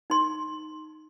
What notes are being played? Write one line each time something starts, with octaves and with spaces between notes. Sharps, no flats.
D#4 C6